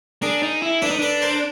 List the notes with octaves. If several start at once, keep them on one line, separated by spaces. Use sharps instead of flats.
D4 G#4 A#4
D#4
E4
D4 A4 B4
D#4
D4 A4 B4
A#4 C5